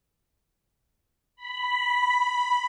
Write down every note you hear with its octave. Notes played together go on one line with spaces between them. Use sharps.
B5